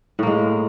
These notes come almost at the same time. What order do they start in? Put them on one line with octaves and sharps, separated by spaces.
A2 A#3 G#3